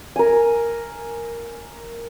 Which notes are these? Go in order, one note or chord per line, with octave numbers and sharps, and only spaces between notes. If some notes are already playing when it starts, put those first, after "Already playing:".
A#4 G#5